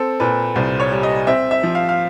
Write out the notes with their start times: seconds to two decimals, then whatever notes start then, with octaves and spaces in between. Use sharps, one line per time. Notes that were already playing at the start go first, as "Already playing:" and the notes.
Already playing: C4 A4
0.20 A#2 B4
0.56 C2 C5
0.80 C#5
0.92 G3
1.03 D#5
1.27 C4 E5
1.51 E5
1.63 F3
1.75 F5
1.89 F5